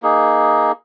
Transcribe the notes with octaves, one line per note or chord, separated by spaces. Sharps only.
A#3 D#4 G#4